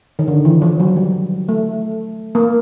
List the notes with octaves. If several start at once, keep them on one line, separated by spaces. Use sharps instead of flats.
D#3
D3
E3
F3
F#3
G3
A3
A#3